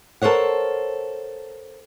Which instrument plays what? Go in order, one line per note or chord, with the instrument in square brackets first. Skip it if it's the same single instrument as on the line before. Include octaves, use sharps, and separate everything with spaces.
[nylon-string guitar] A4 A#4 C5 C#5 F#5